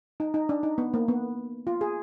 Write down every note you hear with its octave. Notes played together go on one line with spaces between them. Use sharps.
D#4
D#4
D4
D#4
B3
A#3
B3
F4
G#4